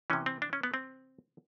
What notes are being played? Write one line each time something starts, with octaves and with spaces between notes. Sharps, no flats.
C3 E3 C#4
C4
D4
C#4
B3
C4